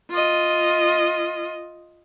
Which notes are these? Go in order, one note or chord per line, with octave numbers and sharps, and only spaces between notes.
F4 D#5